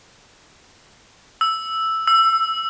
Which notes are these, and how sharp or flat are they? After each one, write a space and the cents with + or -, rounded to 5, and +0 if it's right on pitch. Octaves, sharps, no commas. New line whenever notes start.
E6 +0
E6 +15